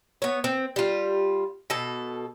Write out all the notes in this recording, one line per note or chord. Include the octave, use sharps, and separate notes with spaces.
B3 C#5
C4
G3 F4
B2 A4